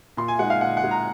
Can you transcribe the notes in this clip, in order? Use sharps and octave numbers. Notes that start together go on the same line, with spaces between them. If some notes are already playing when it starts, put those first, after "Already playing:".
A#2 C6
G#5
G#3 D#4 F#5
F5
A#2 F#5
F#5
G#3 D#4
A#5